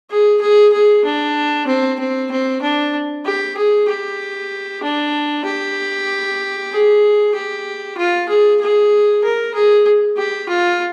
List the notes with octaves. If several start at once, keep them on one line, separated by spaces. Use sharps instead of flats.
G#4
G#4
G#4
D4
C4
C4
C4
D4
G4
G#4
G4
D4
G4
G#4
G4
F4
G#4
G#4
A#4
G#4
G4
F4